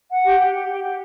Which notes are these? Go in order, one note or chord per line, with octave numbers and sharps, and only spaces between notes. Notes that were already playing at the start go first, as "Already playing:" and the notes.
F#5
G4
G4
G4
G4
G4